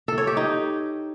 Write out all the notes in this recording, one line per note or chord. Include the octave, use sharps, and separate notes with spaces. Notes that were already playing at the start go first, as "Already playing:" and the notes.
A4
C#5
G4
D#4